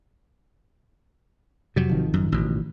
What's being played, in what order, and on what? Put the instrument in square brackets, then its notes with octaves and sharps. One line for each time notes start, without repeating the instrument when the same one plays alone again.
[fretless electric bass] F2 [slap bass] C3 F#3
[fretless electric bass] G#1 D#3 F3
[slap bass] F#2
A1 B2